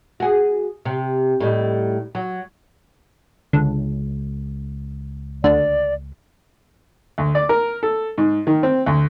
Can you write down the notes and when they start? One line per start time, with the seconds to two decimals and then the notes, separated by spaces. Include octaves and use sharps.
0.20 F#4 G#4
0.85 C3
1.40 A2 G3 D#4
2.15 F#3
3.53 C#2 D3
5.44 D2 D4 D5
7.18 D2
7.35 D5
7.49 A#4
7.83 A4
8.18 G#2
8.47 D#3
8.63 C4
8.86 D2